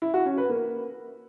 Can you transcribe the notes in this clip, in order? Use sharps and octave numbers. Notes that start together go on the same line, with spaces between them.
E4
F#4
C#4
B4
A#3